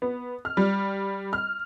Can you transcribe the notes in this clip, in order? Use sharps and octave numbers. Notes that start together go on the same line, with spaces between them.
B3
F6
G3
F6